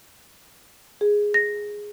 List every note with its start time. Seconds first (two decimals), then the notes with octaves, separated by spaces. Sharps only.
1.01 G#4
1.34 A#6